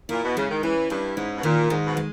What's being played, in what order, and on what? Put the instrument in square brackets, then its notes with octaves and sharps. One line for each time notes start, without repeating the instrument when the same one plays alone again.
[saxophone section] A#2 [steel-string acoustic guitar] E4
[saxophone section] B2
[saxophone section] C#3 [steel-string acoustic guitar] G#3
[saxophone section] D#3
[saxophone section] E3 [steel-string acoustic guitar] C#4
[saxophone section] G2 [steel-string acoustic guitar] E4
[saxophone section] G#2 [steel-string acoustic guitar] C#4
[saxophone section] B2
[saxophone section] A#2 [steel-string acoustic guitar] D#3
[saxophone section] G#2 [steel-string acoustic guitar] D#3
[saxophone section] B2
[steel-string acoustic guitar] G#3